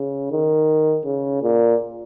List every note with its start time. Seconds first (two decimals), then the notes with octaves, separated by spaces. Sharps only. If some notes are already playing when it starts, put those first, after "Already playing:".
Already playing: C#3
0.31 D#3
1.05 C#3
1.42 A#2